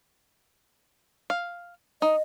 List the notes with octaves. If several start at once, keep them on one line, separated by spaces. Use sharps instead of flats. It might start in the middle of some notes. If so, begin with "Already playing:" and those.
F5
D#4 D#5